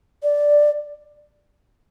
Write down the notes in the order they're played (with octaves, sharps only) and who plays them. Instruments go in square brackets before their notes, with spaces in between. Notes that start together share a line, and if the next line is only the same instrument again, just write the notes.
[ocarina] D5